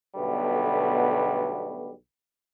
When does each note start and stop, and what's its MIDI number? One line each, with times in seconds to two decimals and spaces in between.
0.16 1.91 35
0.16 1.91 47
0.16 1.91 50
0.16 1.91 55
0.16 1.91 57
0.16 1.91 59